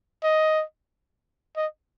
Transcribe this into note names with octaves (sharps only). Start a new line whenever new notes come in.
D#5
D#5